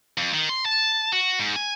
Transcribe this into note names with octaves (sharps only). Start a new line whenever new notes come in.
F2
D#3
C6
A5
F#4
G#2
G#5